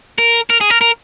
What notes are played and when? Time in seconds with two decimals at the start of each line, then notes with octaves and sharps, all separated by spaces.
0.19 A#4
0.50 A#4
0.61 G#4
0.70 A#4
0.81 A#4